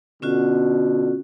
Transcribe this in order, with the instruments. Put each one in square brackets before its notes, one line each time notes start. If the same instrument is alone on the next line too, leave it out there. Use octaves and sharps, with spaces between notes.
[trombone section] B2 D3 [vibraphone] C#4 F4 F#4